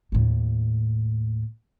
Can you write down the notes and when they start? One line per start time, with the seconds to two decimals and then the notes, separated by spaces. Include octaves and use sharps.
0.12 D#2 A2